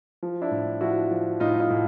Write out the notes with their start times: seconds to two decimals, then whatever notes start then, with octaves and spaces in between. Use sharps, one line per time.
0.23 F3
0.41 D4 E4
0.51 A2
0.81 F3 E4 F#4
1.11 F3
1.40 A2 D#4 F4
1.60 D#4 F4
1.70 A2